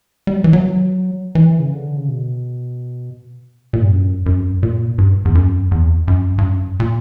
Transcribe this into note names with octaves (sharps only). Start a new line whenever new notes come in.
G3
F#3
E3
F#3
E3
C#3
D3
C#3
B2
A#2
G2
F#2
F#2
A#2
G2
E2
F#2
E2
F#2
G2
F#2
A#2